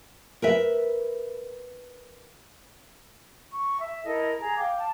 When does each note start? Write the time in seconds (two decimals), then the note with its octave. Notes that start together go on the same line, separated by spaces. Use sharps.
0.42 A#4 B4 E5
3.50 C#6
3.80 E5
4.03 E4 A4 A#4 D#5
4.38 G#4 A#5
4.57 F5 G5 D6
4.78 A5